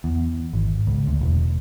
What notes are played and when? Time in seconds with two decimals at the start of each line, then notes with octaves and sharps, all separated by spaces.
0.04 E2
0.53 G#1
0.87 C#2
1.07 D2
1.21 E1